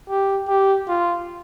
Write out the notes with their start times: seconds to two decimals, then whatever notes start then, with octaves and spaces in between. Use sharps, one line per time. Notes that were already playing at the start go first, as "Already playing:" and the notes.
0.09 G4
0.48 G4
0.88 F4